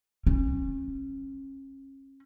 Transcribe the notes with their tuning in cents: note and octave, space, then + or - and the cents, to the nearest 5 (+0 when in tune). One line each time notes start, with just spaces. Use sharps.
C#4 -35